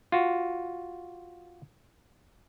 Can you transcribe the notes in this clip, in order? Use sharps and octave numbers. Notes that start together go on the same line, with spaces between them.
F4 F#4